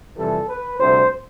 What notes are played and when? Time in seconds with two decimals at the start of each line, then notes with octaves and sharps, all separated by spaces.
0.16 F2 C3 E3 G3 A4
0.48 B4
0.79 D2 C3 G3 C5